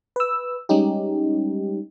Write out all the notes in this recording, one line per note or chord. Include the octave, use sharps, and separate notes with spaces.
B4 E6
G3 G#3 C#4 D#4 G4